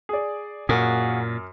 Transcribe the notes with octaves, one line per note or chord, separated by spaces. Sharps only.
G#4 D5
F#2 A#2 A#3 F#4 G#4 A#4